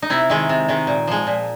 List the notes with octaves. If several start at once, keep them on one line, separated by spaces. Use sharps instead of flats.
D#4
C3 E4
D#3 G#3
C3
D#3 G#3
A#2
F3 G#3
A#2